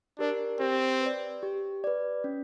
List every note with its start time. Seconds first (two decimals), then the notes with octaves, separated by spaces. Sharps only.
0.19 D4 G4 A#4 D5
0.60 C4 G4
1.01 B4
1.06 D5
1.43 G4
1.84 B4 D5
2.24 C#4